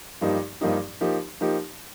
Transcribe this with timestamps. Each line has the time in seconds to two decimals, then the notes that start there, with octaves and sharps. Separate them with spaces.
0.21 G2 F3 A#3 D#4 G4
0.61 G2 F3 A#3 D#4 G4
1.01 F3 A#3 D#4 G4
1.41 F3 A#3 D#4 G4